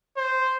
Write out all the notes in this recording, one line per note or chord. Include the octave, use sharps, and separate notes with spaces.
C5